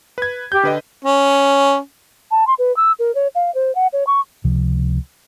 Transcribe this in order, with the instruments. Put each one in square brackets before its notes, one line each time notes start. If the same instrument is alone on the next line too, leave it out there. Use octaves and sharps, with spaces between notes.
[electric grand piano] B4 G#6
[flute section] G4 [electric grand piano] G6
[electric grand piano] D3 B4 D#5
[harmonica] C#4
[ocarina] A5
C6
B4
E6
A#4
C#5
F5
C5
F#5
C#5
C#6
[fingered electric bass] C#2 C3 F3